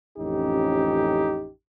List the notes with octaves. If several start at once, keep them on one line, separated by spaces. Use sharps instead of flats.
A1 F2 C#4 D#4 G4